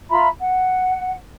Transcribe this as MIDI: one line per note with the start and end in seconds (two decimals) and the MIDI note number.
0.10 0.28 65
0.10 0.28 76
0.10 0.28 82
0.10 0.28 83
0.39 1.15 78